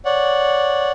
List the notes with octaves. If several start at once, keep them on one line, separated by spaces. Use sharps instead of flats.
C#5 D5 F#5